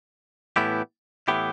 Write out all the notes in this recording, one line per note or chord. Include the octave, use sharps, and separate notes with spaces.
A2 E3 B3 E4 G4
A2 E3 B3 E4 G4